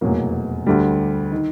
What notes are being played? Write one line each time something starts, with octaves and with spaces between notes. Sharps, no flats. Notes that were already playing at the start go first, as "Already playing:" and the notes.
F1 E2 B2 F#3 A#3
D2 D3 G3
D#3